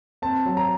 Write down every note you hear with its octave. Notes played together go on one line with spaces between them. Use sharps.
C4 A5
F#3
A#5